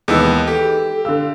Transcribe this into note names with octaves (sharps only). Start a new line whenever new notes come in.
D#2 D#3 E3 G#3 B3 E6
G4 A4
D3 F5 E6